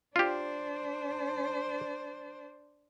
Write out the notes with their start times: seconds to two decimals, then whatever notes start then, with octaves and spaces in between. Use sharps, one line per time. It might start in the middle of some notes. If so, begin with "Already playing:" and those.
0.16 D4 F4 G4 C5